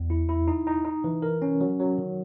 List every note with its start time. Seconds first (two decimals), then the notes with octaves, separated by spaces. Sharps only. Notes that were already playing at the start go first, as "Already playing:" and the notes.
Already playing: E2
0.10 E4
0.29 E4
0.48 D#4
0.67 D#4
0.85 D#4
1.04 E3
1.22 A#4
1.42 C#4
1.61 F#3
1.79 F#3
1.98 D#3